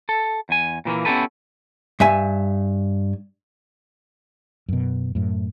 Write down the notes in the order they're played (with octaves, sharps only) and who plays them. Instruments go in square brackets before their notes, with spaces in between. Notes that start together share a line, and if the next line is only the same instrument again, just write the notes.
[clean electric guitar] A4
E2 G#5
A#2 E3 G#3 A#3
B3 C#4 E4 G4 A4 B4
[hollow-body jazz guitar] G2 E5 G#5
[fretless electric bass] F#2 B2
F#2 A2